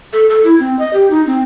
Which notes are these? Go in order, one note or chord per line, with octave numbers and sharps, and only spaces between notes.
A4
A4
E4
C4
D#5
G4
D#4
C4